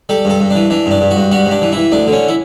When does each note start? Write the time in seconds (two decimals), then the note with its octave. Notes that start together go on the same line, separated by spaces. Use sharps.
0.09 G3 A4
0.25 G2 A4
0.40 G2
0.50 E3 D4
0.70 E3 D4
0.86 G2 D4
1.01 G2
1.11 F#4
1.16 G2
1.31 G3 F#4
1.46 G2
1.51 D4
1.62 E3
1.72 E3 E4
1.92 D2 D4
2.07 D3
2.13 C#4
2.28 E4